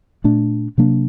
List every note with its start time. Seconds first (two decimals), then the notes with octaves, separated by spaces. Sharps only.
0.24 A#2 A3 D4
0.78 C3 F#3 A#3 D4